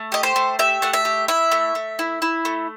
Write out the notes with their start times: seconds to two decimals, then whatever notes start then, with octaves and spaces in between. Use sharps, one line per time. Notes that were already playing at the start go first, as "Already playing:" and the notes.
Already playing: A3
0.12 G4 D#5
0.23 C5
0.36 A3
0.59 G4 E5
0.82 A3 F#5
0.93 E5
1.05 G4
1.28 E4 E5
1.52 A3
1.75 A3
1.99 E4
2.22 E4
2.45 A3